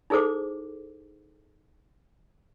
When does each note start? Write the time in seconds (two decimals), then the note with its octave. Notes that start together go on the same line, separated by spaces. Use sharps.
0.10 D#4 E4 G#4 A4 C5 D6